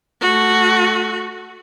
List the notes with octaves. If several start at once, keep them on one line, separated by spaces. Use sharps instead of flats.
A3 F#4